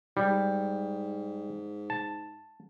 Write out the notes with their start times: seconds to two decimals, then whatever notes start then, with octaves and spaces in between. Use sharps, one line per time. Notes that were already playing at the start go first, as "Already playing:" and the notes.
0.17 G#2 G3
1.90 A5